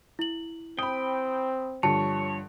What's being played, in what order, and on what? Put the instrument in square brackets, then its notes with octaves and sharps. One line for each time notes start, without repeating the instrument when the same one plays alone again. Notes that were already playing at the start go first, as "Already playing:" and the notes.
[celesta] E4 F#7
[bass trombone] C4 [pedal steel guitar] G5 [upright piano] B5 D#6
[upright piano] G2 D3 F3 [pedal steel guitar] C#5 [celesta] A5